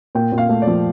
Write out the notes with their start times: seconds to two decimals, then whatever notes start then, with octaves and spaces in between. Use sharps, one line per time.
0.15 A#2 G5
0.32 A#2
0.38 F5
0.49 A3
0.62 D5
0.67 F3